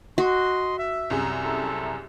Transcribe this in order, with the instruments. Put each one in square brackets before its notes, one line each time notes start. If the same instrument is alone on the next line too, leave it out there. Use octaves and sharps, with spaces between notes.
[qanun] F#4 [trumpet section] D#5 C6
[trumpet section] E5
[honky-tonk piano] C2 F#2 G#4
[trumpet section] C4 E4 A4